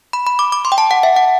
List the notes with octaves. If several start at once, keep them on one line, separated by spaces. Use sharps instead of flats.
B5
B5
D6
D6
C6
G5
A5
F#5
E5
F#5